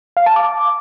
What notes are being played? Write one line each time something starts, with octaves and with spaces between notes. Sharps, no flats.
F5
A5
D6